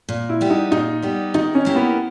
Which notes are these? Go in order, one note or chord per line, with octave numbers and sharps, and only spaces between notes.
A#2
E4
G3 B3 G4
D#4
A#2 D#4
G3 B3 G4
D#3 D#4
C#4
A#3 E4 G4 A#4
B3